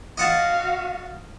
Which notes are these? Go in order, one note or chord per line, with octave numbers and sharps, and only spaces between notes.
F#4 D#5 F5 F#5 A5